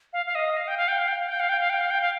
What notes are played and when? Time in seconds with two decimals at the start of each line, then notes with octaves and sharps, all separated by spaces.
0.13 F5
0.26 F5
0.35 D#5
0.57 F5
0.68 G5
0.77 F5
0.88 G5
0.98 F5
1.08 G5
1.19 F5
1.29 G5
1.40 F5
1.49 G5
1.60 F5
1.70 G5
1.81 F5
1.91 G5
2.01 F5